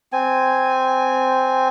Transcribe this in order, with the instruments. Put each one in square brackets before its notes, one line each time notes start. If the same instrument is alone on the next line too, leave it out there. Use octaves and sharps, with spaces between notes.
[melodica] C4 G#5